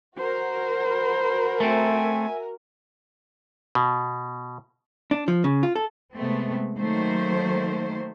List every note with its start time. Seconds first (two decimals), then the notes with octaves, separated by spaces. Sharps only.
0.18 F#4 A#4 C5
0.83 B4
1.60 A3 C4 E5 G#5
3.75 B2
5.11 D4
5.28 F3
5.44 C#3
5.63 F4
5.76 A4
6.15 C3 G#3 A3 B3 C4
6.76 D#3 F#3 A3 A#3 C5